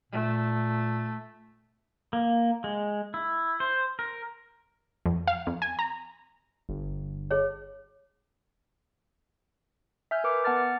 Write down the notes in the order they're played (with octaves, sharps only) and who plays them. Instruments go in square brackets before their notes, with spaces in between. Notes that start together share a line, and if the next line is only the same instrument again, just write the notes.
[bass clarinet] A#2 [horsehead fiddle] A3
[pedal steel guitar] A#3
G#3
E4
C5
A#4
[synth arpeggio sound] F2
F5
F2
G#5
A#5
[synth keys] G1
[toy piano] G#4 C#5
[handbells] E5 G#5 F6 G6
A#4 B4 D6
B3 F#5 A5 F6 A6